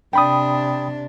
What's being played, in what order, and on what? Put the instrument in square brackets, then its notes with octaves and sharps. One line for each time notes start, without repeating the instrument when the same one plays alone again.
[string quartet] C3 D4 [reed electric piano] G5 B5 D#6